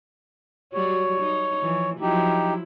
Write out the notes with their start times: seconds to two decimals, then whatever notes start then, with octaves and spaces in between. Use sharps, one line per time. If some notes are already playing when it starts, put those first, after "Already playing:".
0.73 F#3 G3 F#4 C#5
1.20 D#4
1.61 E3 F3
2.00 F3 F#3 D#4 E4 G4